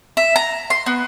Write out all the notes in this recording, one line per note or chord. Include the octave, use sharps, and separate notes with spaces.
E5
A#5
C6
B3